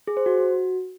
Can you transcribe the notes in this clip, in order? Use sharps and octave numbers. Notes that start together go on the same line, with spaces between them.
G#4
C5
F#4